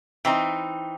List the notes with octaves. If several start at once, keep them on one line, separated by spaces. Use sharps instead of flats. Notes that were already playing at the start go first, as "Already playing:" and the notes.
E3 C4 D#4